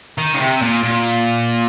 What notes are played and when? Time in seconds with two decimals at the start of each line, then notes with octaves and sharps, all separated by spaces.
0.18 D#3
0.35 C#3
0.40 C3
0.62 A#2
0.83 A#2